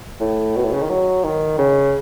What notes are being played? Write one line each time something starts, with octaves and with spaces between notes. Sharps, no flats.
A2
B2
A2
C#3
D#3
F#3
D#3
C#3